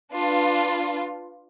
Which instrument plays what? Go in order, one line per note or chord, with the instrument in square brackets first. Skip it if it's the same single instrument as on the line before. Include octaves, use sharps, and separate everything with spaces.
[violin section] D4 F4 B4